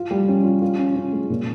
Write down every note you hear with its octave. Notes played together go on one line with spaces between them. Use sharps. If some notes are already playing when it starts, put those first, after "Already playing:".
Already playing: F4
G3
C#4
F4
F4
C#4
C#4
G#3
A#2